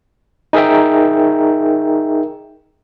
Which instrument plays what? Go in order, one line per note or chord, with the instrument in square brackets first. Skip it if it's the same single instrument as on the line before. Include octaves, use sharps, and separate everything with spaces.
[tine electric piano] D#4 G#4 A#4 E5 G5